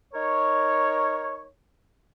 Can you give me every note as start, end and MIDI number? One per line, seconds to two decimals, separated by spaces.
0.14 1.46 63
0.14 1.46 70
0.14 1.46 73